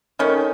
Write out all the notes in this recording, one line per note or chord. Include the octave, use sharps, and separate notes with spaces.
D#3 A3 C#4